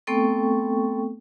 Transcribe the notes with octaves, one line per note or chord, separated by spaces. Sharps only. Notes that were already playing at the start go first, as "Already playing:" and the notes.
A3 B3 C4 A4 G5 C#6